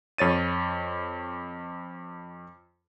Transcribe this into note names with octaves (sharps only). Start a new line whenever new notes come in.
F2 C#5 A6 D#7